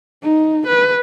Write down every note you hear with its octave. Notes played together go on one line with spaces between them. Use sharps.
D#4
B4